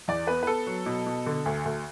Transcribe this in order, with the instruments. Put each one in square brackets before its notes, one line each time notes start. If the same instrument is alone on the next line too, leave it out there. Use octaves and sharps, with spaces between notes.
[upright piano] E2 D5
B3 B4
B4
B3 A4
F#3
B2
B2
D3
D2
D2